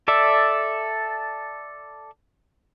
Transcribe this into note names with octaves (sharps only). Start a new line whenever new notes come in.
A4 D5 E5